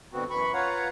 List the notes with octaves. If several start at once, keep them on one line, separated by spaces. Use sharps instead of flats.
G2 B2 D3 B3 C4 F#4
F#2 E3 B5 C#6
F4 B4 C#5 F5 F#5 A#5